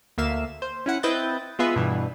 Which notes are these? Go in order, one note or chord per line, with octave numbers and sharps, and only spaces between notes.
D2 A#3 E5 F5 E7
C5
C#4 E4 F#5
C4 E4 B4 D#5 G6 A6
G#3 B3 F4 G#4 B4 E5
G2 B2 E3